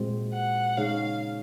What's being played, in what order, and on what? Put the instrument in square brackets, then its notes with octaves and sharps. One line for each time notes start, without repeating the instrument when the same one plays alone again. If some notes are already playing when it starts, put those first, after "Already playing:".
Already playing: [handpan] A#2 G#3 C4 F#4 C5
[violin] F#5
[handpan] C#3 G#3 D#4 G#4 C#5 [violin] F5